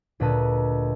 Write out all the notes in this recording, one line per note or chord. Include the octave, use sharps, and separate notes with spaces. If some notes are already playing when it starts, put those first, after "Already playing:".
D2 A#2 B4 D#5 A5 D#7